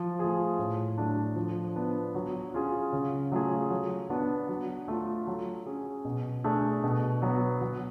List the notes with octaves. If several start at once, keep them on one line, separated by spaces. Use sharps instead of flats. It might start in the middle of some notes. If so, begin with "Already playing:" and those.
Already playing: F3
A3 F4 G#4
A2
F#3 A3 D4
F3
B3 D4
F#3
C#4 F4 G#4
C#3
F#3 A3 F4 G#4
F#3
B3 D4 F#4
F#3
A3 F4
F#3
C#4 G#4
B2
A3 D4 G#4
B2
F#3 B3 F#4
F#3